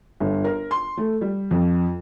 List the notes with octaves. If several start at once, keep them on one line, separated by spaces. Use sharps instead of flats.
G1
A#4
C6
A3
G3
F2